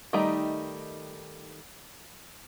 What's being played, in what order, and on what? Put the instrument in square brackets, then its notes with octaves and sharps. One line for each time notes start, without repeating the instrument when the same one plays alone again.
[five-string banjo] D#3 G3 A3 D#4 A#5